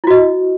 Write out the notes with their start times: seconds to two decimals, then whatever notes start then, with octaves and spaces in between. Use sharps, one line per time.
0.04 E4
0.07 F#4
0.11 D#5